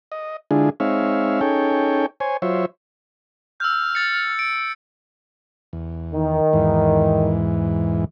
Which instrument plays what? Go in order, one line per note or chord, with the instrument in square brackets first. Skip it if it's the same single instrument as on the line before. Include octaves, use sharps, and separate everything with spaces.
[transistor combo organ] D#5
D3 G#3 D4 E4 F4 G#4
G#3 C4 D#4 C#5 E5 F5
C#4 D#4 G#4 A4 C#5 G5
C5 C#5 G#5
F#3 F4 C5 C#5 E5
[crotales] E6 G6 [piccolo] F6
[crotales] A6 C#7
D7
[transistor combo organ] E2
[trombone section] D#3
[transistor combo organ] E2 G#2 E3